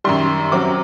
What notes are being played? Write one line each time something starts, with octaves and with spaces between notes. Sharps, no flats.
F#2 D#3 G3 C6
F#2 F#3 C4 D6